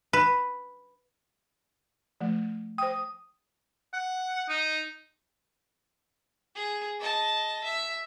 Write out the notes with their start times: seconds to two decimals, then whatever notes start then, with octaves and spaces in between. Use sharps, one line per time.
0.13 B4
2.21 F3 A3
2.78 C5 G5 D#6
3.93 F#5
4.49 D#4
6.56 G#4
7.01 D#5 A5
7.64 E5